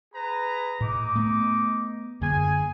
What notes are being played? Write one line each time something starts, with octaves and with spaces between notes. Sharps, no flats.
G#4 B4 A#5
A2 D#4 D6
A3 B3
F#2 D3 A#3 G#4 G#5